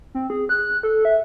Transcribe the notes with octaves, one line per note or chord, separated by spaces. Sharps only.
C4
G#4
F#6
A4
E5